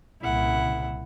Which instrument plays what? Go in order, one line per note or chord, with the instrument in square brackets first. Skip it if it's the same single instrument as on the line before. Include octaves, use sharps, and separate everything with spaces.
[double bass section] C2 A#2 C#3 [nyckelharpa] E4 F#5